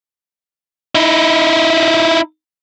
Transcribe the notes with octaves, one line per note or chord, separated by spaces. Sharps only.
D#4 E4